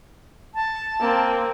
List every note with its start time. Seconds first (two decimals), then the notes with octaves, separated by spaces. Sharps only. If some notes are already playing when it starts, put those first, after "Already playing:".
0.54 A5
1.00 A#3 C4